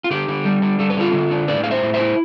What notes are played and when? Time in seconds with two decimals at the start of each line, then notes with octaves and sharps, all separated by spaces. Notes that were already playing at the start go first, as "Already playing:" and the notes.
0.04 F4
0.11 D3 G4
0.29 D3
0.45 G3
0.62 D3
0.79 G3 A4
0.90 B4
0.97 D3 F4 A4
1.13 D3
1.31 D4
1.48 A2 B4 D5
1.64 A3 F5
1.71 C5 E5
1.83 A2
1.94 C5 E5
2.00 E4